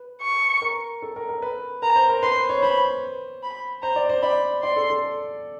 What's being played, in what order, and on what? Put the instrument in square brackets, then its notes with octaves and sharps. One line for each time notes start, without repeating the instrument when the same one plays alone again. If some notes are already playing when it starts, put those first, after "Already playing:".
Already playing: [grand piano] B4
[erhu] C#6
[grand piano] A#4
A4
A#4
A#4
B4
[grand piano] A#4 [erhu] A#5
[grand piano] C5
A#4
[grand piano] B4 [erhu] C6
[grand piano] C5
C#5
[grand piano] C5 [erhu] B5
[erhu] B5
[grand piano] C5 [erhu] A#5
[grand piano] D5
C5
[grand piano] D5 [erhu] B5
[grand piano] D5 [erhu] C6
[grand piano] A4
A4